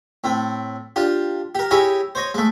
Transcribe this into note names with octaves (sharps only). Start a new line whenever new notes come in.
A2 C4
D4 F4 G4
G4 A#4
E4 G4 G#4 C#5 D#5
C5 C#5 D#5
G#3 A3